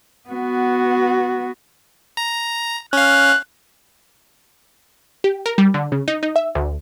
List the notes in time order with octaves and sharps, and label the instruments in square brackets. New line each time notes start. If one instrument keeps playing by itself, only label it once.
[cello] B3 F#4
[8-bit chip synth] A#5
[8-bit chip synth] C#4 F5 [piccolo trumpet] F#6
[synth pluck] G4
A#4
G3
D3
C#3
D#4
D#4
E5
D2